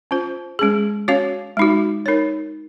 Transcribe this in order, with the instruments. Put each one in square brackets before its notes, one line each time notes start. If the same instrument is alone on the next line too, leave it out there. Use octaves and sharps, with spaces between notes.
[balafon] C#4 F4 C5
G#3 C#4 G#4
C#4 F#4 C#5 F5
G#3 D#4 F#4
D#4 A#4 C#5